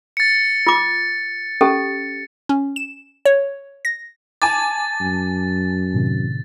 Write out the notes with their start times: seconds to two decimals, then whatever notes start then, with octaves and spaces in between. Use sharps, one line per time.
0.17 A6 C#7
0.67 F4 D6
1.61 C#4 G4 A4
2.49 C#4
2.76 E7
3.25 C#5
3.85 A#6
4.42 G#5 A5 D6 A6
5.00 F#2
5.94 A2 C3 D#3